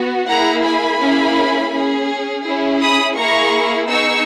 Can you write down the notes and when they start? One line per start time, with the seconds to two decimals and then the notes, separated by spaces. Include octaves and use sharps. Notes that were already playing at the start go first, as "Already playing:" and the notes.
Already playing: B3 F#4
0.28 A#3 E4 G#4 F#5 A#5
0.64 G#5 B5
1.00 A#3 C#4 E4 G#4
1.73 C#4 G#4
2.45 C#4 E4 G#4
2.81 B5 D#6
3.17 A#3 E4 G#4 A#5 C#6
3.89 B3 D#4 G#4 C#6 E6